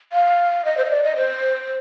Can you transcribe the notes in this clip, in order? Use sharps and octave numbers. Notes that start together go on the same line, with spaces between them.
F5
D#5
C5
D#5
D5
D#5
C5